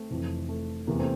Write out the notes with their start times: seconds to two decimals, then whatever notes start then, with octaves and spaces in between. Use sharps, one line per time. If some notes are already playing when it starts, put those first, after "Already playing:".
Already playing: A3 C4
0.11 F1 F2 E3
0.49 A3
0.87 E2 C3 E3 A#3
0.99 A3 C4